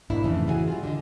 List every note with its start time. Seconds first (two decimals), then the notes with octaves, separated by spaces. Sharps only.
0.10 G#2 B2 A#3 D4 E4
0.24 F2 A2 C#3 E3 A3
0.47 D#2 E3 E4 F#4 G#4 G#5
0.68 G3 F4
0.83 D3 D#5